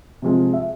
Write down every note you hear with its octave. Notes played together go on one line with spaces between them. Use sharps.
C3 F3 G#3
E5